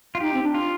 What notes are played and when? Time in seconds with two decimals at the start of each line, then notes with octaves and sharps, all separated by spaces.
0.15 F4
0.20 D#4 G4
0.34 C4
0.43 D4
0.54 F4